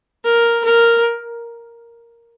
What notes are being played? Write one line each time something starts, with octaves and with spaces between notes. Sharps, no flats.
A#4
A#4